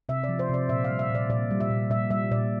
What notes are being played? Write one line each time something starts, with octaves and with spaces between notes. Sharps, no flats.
C3 E5
D5
F3
C5
C3 D5
A#2 E5
F5
G3
E5
A#2
D5
A#2 D5
G3
E5
A#2
A#2 E5
G3 E5
A#2 D5